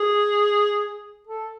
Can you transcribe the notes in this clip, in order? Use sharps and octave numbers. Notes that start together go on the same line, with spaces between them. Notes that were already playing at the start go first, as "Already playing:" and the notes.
Already playing: G#4
A4